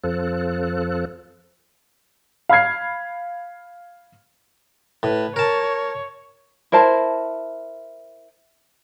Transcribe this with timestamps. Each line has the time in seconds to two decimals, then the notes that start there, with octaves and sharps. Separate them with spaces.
0.04 F2 F3 A4 F#6
2.49 F5 B5 F6 G#6 C7
5.03 A2 B4
5.36 A#4 C#5 A5
6.72 E4 A#4 C5 A5